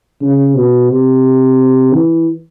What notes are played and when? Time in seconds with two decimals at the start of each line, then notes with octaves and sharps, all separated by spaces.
0.21 C#3
0.57 B2
0.90 C3
1.93 E3